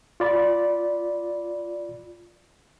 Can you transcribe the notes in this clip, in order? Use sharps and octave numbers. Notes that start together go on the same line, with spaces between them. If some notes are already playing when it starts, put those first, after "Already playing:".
F4 D5 B5